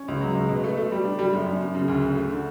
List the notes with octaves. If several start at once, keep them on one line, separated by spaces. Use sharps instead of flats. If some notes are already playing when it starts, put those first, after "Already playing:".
Already playing: C#4
C#2
F#3
C#2
B2
A3
A3
G3
D4
G3
F#2
F#2
F#2
C#3
D2
D2
A3
D3